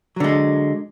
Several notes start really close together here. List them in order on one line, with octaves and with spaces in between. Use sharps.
F#3 D3 G#3